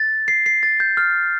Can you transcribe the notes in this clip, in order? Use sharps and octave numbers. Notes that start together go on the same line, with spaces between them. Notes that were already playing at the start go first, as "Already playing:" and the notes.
Already playing: A6
C7
C7
A6
G6
F6